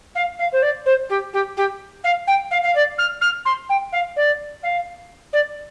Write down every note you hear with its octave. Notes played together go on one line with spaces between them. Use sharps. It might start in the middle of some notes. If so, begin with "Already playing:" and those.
F5
F5
C5
D5
C5
G4
G4
G4
F5
G5
F5
F5
D5
F6
F6
C6
G5
F5
D5
F5
D5